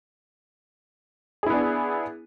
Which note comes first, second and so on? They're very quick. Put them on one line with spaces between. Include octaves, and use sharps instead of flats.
G#4 E4 B3 D4